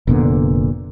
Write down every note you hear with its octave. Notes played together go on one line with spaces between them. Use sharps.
F1 A#2 D3 B3